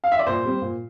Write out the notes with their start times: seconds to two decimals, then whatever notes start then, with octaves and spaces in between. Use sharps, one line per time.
0.04 F5
0.12 E5
0.19 D5
0.27 A#2 C5
0.44 G3 C4
0.62 A#2